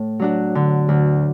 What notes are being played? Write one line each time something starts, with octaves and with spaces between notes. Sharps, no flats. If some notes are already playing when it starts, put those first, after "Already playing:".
Already playing: A2
F#3 D4 F#4
D3
D2